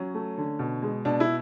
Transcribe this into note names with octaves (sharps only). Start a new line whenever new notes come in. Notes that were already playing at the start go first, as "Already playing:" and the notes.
Already playing: F#3 C#4
A3
D3
B2
G#3
B2 D4
E4